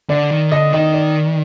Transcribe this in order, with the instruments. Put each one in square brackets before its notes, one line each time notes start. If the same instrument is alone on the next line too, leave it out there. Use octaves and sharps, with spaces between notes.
[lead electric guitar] D3 [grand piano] D5
[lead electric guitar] D#3
[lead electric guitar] D3 [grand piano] D#5
[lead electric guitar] D#3 [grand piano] D#5
[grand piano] D5